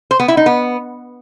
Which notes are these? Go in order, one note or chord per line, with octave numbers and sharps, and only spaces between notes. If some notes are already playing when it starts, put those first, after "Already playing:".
C5
B3
E4
D#4
B3